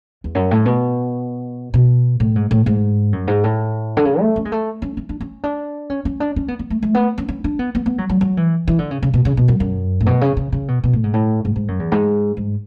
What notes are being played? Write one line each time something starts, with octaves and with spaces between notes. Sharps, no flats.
E2
F#2
A2
B2
B2
A2
G#2
A2
G#2
F#2
G#2
A2
D3
C#3
A3
C#4
G#3
A3
C#4
C#4
D4
C#4
D4
C#4
C#4
D4
C#4
B3
B3
A3
A3
B3
C#4
C#4
D4
B3
B3
B3
F#3
F#3
F#3
E3
E3
D3
C#3
C#3
B2
C#3
B2
F#2
F#2
A2
B2
C#3
C#3
C#3
B2
B2
A2
G#2
A2
G#2
G#2
F#2
E2
G#2
G#2